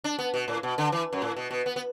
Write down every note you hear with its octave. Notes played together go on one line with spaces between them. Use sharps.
D4
B3
B2
A2
B2
D3
E3
F#2
A2
B2
B2
B3
B3